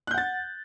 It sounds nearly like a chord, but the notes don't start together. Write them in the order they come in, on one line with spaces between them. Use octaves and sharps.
F#6 G6 F#5 A6